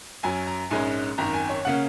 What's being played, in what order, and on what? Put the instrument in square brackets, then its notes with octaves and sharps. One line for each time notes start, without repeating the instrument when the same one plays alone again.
[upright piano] F#2 F#3 C#4 G#5
A#5
A#1 G#2 G#3 C#4 G#5
G#1 F#2 D#3 A#5
G#5
C#5
C#3 A#3 C#4 F#5